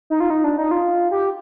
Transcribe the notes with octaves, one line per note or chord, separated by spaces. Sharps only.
D#4
F4
D#4
D4
D#4
F4
G4